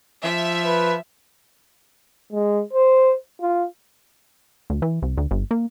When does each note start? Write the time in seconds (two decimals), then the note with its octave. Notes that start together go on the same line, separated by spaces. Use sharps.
0.24 F3 E5
0.65 B4
2.32 G#3
2.73 C5
3.41 F4
4.70 D2
4.82 E3
5.02 C2
5.17 D2
5.31 G1
5.51 A#3